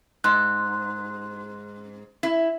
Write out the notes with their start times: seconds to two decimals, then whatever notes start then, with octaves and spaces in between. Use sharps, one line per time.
0.24 G#2 C6 F#6
2.23 E4